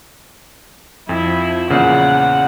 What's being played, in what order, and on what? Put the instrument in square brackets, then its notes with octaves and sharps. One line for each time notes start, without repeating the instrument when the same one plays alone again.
[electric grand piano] F2 [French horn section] F3 [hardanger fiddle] E4
[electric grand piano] E2 A#2 C#3 [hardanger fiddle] F#5